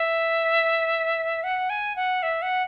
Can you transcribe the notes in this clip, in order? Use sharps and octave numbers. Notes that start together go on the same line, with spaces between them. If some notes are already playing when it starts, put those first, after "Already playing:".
Already playing: E5
F#5
G#5
F#5
E5
F#5